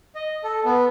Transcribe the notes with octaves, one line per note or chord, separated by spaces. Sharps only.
D#5
A4
B3